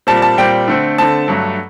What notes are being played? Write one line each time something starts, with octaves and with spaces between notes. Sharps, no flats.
A#2 G3 C4 A5
A5
A#2 G3 C4 G5
D3 A3 C4
D3 A3 C4 A5
G2 F#3 A3